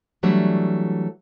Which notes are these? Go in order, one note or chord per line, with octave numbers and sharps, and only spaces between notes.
E3 F#3 G3 A3 D4